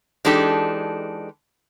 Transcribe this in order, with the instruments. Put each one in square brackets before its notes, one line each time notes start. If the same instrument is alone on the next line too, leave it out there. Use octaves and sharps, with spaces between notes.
[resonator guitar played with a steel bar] E3 G#3 D4 D#4 G4 A4